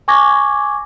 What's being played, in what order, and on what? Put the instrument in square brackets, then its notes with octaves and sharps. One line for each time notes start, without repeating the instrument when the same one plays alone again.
[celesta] G#5 C#6 D6 G#6 A#6